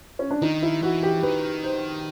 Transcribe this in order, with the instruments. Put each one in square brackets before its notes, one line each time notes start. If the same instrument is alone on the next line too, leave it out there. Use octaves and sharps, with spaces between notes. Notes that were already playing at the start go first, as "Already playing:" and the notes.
[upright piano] C#4
D4
[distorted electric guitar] D#3 [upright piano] D#4
[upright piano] E4
[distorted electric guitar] E3 [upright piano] F#4
[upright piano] G4
[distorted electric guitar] D#3 [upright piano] B4
[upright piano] C5